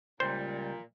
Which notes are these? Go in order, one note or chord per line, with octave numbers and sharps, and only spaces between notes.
C#2 A#2 G3 C5